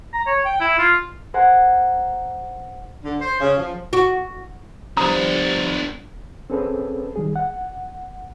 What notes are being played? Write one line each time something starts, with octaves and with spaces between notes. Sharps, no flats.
A#5
C#5
G5
E4
F4
A#4 C5 F#5 G#5
D3
C5
C#3
F3
F#4
C2 F3 B3 D4 A#5 D#6
C4 C#4 G#4 A4 B4
D#3 G3 G#4
F#5